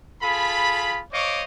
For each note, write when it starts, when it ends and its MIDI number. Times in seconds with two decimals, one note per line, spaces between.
0.22 1.01 65
0.22 1.01 68
0.22 1.01 69
0.22 1.01 83
1.12 1.44 72
1.12 1.44 73
1.12 1.44 75
1.12 1.44 77
1.12 1.44 85
1.12 1.44 86